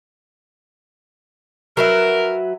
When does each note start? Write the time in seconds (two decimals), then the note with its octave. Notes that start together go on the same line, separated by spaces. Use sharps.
1.77 F#3 A#4 B4 E5